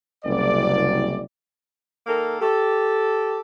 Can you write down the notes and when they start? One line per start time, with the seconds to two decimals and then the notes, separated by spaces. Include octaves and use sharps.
0.25 F#1 C2 D5
2.06 D#3 A#3 A4 A#4
2.40 G4 A4